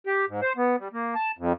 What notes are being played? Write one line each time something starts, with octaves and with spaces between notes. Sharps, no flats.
G4
G#2
C5
B3
G3
A#3
A5
F2